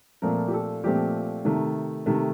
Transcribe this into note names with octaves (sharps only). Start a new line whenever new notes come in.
A#2 F3 A3 C4 A#4
G4
A4
A#2 F3 A3 C4 G4
C3 D#3 A3
C3 D#3 A3